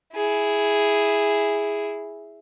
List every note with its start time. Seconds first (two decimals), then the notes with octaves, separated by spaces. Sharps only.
0.14 E4 G#4